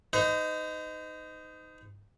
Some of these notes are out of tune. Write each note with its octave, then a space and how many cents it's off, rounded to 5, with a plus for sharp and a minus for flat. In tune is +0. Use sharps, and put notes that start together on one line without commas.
D#4 +0 C5 -45